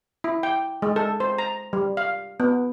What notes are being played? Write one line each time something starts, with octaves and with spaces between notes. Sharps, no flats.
E4
G5
G#3
A4
C5
A#5
G3
F5
B3